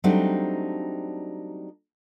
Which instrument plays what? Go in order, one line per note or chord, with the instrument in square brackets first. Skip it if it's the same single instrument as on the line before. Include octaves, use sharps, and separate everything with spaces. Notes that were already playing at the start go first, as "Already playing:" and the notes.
[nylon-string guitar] F#3 G3 A3 C4 D4 D#4